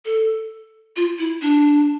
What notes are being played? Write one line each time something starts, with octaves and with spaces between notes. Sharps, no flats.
A4
F4
E4
D4